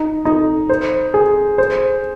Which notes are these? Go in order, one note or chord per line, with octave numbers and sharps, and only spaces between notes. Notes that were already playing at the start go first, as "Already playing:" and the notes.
Already playing: D#4
D#4
C5
G#4
C5